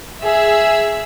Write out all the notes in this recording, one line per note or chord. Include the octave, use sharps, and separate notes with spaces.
G#4 E5 E6